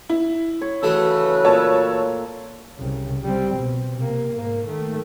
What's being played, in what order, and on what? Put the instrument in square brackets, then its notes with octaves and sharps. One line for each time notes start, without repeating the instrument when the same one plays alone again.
[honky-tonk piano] E4
[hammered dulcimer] C#5
[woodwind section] C#3 B4 E6 [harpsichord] E3 F#3 A3 [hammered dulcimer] A4
[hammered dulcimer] A#2 [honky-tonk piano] C#5 A5
[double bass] C2 C#3
G3 C4
B2
C3 A#3
G#2 A#3
D#3 A3